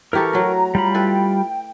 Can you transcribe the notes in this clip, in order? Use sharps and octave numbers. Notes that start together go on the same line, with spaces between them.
E3 G4 A4 A#4 A#5 C#6
F#3 A3
G3 F4 B5
E4 A4 B4 G5